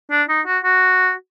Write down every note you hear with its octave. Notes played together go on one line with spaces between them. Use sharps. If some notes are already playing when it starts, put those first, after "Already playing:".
D4
D#4
F#4
F#4